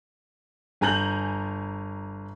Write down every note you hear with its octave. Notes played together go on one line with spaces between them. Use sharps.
G1 G#5 A#5 G6 F#7